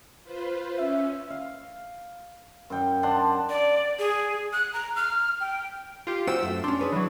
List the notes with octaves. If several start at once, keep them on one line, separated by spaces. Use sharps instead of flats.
F4 B4 C5
C#4 E5
F5
F#2 G5
D4 F#5 A5 C6
D5
G#4
F#6
A#5
F6
G5
F4 G4
F#4 C5 G5 E6
F#2 A3
C#4 D4 C6
G#4 B4 C#5
E3 F#3